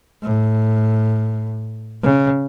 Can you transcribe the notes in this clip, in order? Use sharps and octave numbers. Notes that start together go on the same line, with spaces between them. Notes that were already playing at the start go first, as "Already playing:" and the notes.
A2
C#3